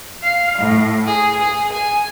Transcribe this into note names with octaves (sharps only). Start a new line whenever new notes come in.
F5
A2
G#4
G#4
G#5